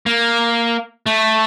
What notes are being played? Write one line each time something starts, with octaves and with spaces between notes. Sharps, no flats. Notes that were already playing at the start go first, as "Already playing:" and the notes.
A#3
A3